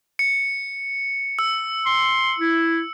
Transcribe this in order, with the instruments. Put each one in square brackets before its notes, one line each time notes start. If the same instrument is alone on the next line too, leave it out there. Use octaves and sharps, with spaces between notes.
[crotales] C#7
E6
[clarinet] C6
E4